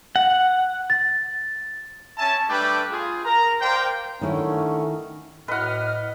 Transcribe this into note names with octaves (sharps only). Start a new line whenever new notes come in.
F#5
A6
C#4 E5 G#5 A5
G3 A3 D4 B4 D5 G5
F4 G#4
A#4 A#5
A#4 C5 D5 F5 G5
D3 D#3 A3 C#4 E4
A2 B4 D#5 F#5 F6